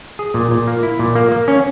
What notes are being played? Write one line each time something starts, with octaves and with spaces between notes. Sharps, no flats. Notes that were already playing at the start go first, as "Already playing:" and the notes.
G#4
A#2
A#2
A#3
E4
A#2
A#3
A#3
C#4